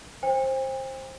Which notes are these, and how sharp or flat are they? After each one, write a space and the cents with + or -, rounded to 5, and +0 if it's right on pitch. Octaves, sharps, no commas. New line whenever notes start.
C5 +20 G5 +45